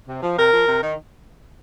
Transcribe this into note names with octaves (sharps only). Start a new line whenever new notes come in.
C3
F3
C3 A#4
F3
C3
D#3